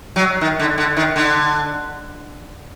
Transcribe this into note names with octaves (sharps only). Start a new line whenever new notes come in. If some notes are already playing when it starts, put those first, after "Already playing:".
F#3
D#3
D3
D3
D#3
D3